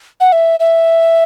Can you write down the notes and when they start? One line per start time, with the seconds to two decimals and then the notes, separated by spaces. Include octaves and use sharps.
0.20 F#5
0.32 E5
0.60 E5